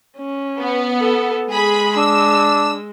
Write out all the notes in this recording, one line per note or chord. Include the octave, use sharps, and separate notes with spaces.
C#4
B3
A4
G#3 G#4 B5
D4 E6